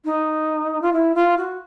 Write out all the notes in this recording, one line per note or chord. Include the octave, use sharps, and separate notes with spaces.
D#4
F4
E4
F4
F#4